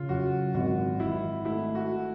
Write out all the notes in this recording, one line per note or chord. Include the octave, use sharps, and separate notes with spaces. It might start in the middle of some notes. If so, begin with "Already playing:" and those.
Already playing: C#3 F4
F#2 F#4
G#1 F#4
G#1 E4
A3 E4
F#4